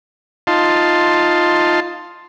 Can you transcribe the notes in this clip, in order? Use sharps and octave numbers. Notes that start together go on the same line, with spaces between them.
D#4 F4 A5 C6